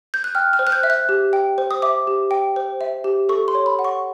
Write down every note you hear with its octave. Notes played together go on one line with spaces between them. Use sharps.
G6
F#6
G5 F6
F6
C5
F#6
G6
E5
F#6
G4
G5
C5
D#6
E5 D6
G4
G5
C5
E5
G4
A4 C#6
C6
C#5
B5
F#5
C#6